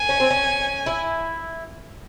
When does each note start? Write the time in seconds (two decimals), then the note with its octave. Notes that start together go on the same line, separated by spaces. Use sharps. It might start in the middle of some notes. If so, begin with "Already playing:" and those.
Already playing: G#5
0.09 C#4
0.20 C4
0.30 C#4
0.86 E4